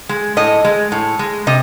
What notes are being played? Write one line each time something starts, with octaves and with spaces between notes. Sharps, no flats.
G#3
A2 D#5
G#3
A2
G#3
C3 D#5